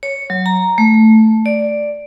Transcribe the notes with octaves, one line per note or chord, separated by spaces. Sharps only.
C#5
F#3
A#5
A3
D5